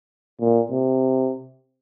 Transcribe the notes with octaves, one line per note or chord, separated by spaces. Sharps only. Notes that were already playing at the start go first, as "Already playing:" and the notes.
A#2
C3